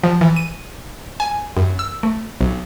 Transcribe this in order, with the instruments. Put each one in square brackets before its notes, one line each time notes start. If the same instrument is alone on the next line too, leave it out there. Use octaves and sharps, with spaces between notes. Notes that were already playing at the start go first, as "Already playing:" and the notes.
[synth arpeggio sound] F3
E3
D#7
G#5
F#2
E6
A3
B1